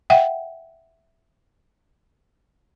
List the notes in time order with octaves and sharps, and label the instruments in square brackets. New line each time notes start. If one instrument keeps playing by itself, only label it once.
[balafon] E5 F#5 G5